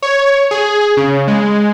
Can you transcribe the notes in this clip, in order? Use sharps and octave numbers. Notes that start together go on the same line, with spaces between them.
C#5
G#4
C#3
G#3